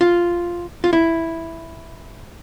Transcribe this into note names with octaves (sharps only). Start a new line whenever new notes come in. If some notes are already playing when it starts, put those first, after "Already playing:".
F4
F4
E4